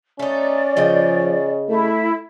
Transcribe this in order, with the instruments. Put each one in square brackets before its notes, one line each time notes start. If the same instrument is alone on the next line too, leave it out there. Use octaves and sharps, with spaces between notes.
[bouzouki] A3 D#4 [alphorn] C#4 [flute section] D5
[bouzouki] C#3 D#5 G5 [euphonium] F3
[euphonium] A3 [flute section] E4